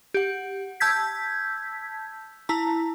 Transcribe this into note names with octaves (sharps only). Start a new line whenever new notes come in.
G4 F#5
A5 E6 G6 G#6 B6
E4 A5 A#5